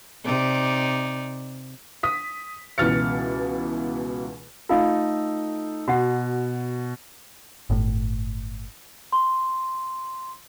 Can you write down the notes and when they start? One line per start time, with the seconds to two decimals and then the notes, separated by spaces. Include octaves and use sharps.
0.25 C3 D#4 D5
2.03 D#6 B6
2.78 C#2 B2 E3 F6 A6 C#7
4.69 A3 D#4 F4 A4 F5
5.88 B2 F#4 F#5
7.70 G1 A2
9.12 C6